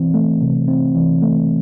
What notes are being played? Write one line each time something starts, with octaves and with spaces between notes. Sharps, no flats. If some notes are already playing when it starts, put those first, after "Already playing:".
Already playing: E3 C4
A3
C3
C4
E3
A3